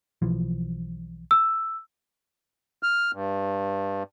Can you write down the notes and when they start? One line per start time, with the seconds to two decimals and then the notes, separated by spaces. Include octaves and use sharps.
0.22 B1 E3 F3
1.31 E6
2.83 F6
3.13 G2